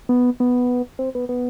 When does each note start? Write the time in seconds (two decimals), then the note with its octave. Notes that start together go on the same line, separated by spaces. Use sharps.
0.09 B3
0.40 B3
0.99 C4
1.15 B3
1.29 B3